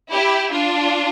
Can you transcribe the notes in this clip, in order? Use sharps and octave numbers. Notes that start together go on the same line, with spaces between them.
E4 G4
D4 F4